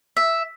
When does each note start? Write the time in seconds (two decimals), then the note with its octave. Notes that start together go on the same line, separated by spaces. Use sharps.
0.17 E5